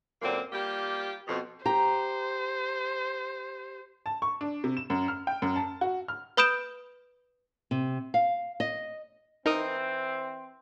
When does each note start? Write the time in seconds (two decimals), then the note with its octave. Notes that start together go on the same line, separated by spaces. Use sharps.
0.22 F#2 A#2 D3 A#3 C4
0.52 G3 A#3 F4 G4
1.28 F2 B2
1.65 G4 C5 A#5
4.06 A5
4.22 C#6
4.41 D4
4.64 C3
4.77 E7
4.90 F#2
5.08 F6
5.27 G5
5.42 F#2
5.56 A5
5.81 F#4
6.08 F6
6.37 B4 B5 D#6 G6 D7 E7
7.71 C3
8.14 F5
8.60 D#5
9.46 E3 C4 D#4 A#4 D#6